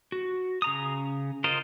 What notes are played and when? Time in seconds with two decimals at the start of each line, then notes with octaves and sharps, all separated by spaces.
0.12 F#4
0.62 C#3 A#5 D#6
1.44 F4 A#4 C5 D#5